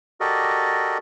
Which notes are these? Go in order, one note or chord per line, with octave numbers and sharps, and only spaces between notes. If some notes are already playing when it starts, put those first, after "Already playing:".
F#4 G4 A4 A#4 D5 D#5